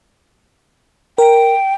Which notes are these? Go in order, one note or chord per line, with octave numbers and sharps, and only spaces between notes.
A#4 G5